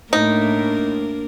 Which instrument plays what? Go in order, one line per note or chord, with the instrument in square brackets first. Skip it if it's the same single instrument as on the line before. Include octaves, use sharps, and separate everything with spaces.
[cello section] A2 [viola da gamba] A#3 D4 A#4 [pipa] D#4